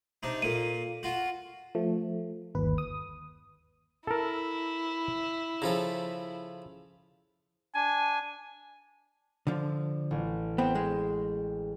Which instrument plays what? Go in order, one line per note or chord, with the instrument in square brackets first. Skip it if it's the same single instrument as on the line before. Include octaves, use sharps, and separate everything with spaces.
[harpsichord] C3 D4 D#4
[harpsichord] A#2 A#3 [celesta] A4 D#7
[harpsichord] F4 F#4
[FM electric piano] F3 A3
G1 D#2 B4
D#6
[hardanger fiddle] E4 [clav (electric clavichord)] A4 A#4
[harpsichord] C#3 F3 A4 [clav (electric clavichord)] A#5
[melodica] D4 [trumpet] G#5
[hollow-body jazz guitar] D3 F3
[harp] A1
[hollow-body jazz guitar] B3 C4 [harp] G5 E7
[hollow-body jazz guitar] G#3